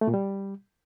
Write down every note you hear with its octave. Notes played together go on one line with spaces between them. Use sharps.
A3
A#2
G3